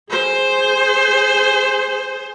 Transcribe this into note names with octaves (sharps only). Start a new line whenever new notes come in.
G#4 C5